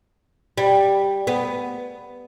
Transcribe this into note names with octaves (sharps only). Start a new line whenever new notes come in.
G3
B3